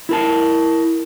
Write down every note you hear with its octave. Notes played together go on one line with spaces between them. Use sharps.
E4 A#4 A5